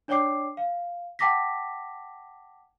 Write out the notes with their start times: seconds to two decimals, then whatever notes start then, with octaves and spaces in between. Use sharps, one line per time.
0.08 D4 C#5 D5 G5 D6 C7
0.57 F5
1.19 F#5 G5 A5 D6 A#6 B6